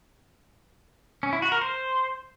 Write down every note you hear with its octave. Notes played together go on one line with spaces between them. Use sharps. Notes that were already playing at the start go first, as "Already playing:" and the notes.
C#4
E4
F#4
A#4
C5